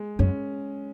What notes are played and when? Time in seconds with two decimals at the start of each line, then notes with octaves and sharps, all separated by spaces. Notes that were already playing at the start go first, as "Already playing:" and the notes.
Already playing: G#3
0.19 F#2 C#4